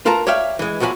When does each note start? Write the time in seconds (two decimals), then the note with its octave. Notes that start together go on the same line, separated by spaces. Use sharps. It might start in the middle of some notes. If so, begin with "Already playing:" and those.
0.06 F4 A#4 B4 A5 A#5
0.27 C#5 D5 E5 F5 G5
0.59 E3 G#3
0.80 E2 F3 F#3 A#4 G#5 B5